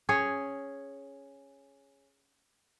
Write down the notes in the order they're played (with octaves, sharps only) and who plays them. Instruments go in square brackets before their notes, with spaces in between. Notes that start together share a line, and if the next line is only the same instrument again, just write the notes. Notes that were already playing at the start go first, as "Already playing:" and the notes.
[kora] C#4 G#4 C#5